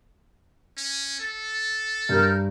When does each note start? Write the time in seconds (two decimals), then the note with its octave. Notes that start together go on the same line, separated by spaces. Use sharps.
0.78 C#4
1.20 A4
2.09 G2 A#4 F6 G6